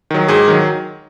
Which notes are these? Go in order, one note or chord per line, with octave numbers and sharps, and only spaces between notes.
D#3 F#3
G#2 G#4
D#3 F#3